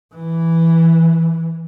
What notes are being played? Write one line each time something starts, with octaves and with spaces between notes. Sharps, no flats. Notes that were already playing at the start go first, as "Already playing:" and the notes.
E3